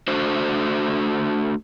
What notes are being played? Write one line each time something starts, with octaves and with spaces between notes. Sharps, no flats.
A3 D4 F#4 C5